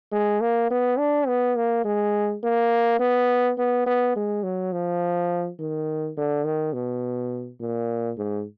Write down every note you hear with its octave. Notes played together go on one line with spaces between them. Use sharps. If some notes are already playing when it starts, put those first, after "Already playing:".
G#3
A#3
B3
D4
B3
A#3
G#3
A#3
B3
B3
B3
G#3
F#3
F3
D#3
D3
D#3
B2
A#2
G#2